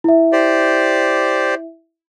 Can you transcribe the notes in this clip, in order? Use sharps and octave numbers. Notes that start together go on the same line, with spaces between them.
E4 E5
G4 C5 D5